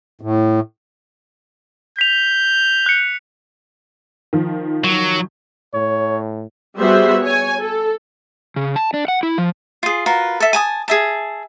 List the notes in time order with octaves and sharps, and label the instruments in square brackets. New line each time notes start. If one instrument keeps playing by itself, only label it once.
[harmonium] A2
[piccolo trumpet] G6 [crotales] B6 F7
[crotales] F#6 C#7
[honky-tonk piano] D#3 F3
[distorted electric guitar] F#3
[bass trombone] A2 [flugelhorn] C#5
[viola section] G3 B3 F#4 G#4 C5 E5
C#5 G#5
A4
[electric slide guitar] C#3
A5
D4
F#5
E4
F3
[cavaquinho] F4 G#4
F4 F#4 A#4 B4
A4 E5
G#5 A5 D#6
G#4 E5 A5